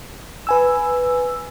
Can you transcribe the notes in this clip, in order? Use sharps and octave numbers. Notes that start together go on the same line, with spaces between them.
B4 G#5 E6